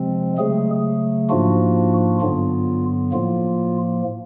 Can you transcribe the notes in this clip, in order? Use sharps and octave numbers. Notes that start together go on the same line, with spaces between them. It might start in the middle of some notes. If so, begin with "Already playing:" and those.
Already playing: C3 F3 G#3 C4
C#3 F#3 G#3 A3 G#4
G#2 F3 A#3 D4 F4 F#4
G2 D3 F#3 B3 F4
A2 F3 A#3 F4